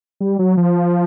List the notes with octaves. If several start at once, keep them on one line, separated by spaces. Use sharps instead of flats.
G3
F#3
F3